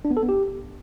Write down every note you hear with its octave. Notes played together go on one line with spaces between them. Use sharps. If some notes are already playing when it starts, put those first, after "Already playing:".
D4
B3
A4
B3
G4